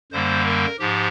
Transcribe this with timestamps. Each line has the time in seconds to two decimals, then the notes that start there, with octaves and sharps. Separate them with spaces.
0.12 F#2 D3 G3 A#3 C5
0.46 A#4
0.79 G#2 F3 G4